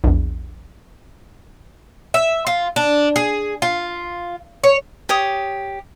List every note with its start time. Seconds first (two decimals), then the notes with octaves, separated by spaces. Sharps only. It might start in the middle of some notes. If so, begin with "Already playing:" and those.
0.04 A#1 E2
2.14 E5
2.47 F4
2.76 D4
3.16 G#4
3.62 F4
4.64 C#5
5.09 G4 C#5 D#6